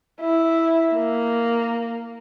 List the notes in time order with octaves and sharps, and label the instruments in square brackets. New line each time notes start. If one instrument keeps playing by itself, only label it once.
[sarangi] E4
A#3